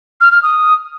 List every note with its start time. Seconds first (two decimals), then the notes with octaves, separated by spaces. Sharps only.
0.21 F6
0.32 F6
0.43 D#6